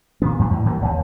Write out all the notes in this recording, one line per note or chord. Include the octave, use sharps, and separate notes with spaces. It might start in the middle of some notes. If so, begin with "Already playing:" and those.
A#2 D#3 B3
G2 A#2 F#3
E2 A2 E3
E2 E3 G3 A#3
E1 D#2